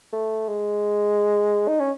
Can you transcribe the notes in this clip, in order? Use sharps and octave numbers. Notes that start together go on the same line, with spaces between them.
A3
G#3
D#4
C#4